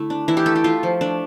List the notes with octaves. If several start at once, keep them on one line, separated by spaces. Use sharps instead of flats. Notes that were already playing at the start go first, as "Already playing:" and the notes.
Already playing: D3 A3 E4
D4
E3 E4
G4
A3 A4
G4
A3 F4
F3
A3 D4